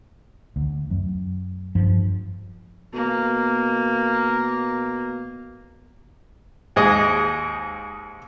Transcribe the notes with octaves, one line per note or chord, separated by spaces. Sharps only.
D2
F#2
G2 F3
B2 A#3
D#2 G#2 G#4 D#5 D#6